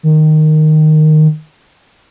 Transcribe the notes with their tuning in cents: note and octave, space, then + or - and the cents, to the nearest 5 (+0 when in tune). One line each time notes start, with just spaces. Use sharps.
D#3 -10